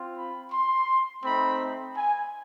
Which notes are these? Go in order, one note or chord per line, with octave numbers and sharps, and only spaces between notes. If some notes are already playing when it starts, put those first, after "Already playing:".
Already playing: C4 F4
B5
C6
A3 C4 D#4 B5
G#5